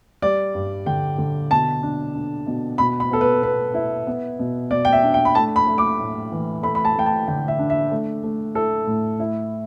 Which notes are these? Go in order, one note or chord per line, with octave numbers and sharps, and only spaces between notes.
G3 D5
G2
D3 G5
D3
B2 A5
D4
D4
B2
B2 B5
B5
B3 A4
B4
B3 B4
E4
B3
B2
B2 D5
G5
E5
D4
G5
B5
A3 A5
B5
A3
D6
A2
E3
A3 B5
B5
A5
A3 G5
A5
D3 G5
E5
D4
E5
A3
A3
E4 A4
A2
E4